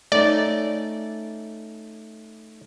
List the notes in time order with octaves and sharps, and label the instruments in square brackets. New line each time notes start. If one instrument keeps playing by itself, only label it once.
[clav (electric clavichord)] A3 C#4 D#4 [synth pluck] D5